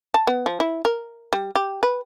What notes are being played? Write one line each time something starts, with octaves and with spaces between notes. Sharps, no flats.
A5
B3
F3
E4
A#4
G3
G4
B4